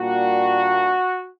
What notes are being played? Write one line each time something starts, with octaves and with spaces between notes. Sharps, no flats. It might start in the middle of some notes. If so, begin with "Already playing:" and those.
Already playing: A#2 G3 A#3 D4 F#4